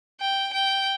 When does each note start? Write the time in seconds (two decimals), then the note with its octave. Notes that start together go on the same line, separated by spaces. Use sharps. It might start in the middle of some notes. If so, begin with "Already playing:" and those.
0.20 G5
0.53 G5